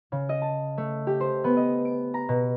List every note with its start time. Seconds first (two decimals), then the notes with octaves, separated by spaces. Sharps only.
0.12 C#3
0.29 D#5
0.42 A5
0.78 A3
1.07 G4
1.20 C5
1.44 B3
1.57 D#5
1.85 D7
2.14 A#5
2.29 B2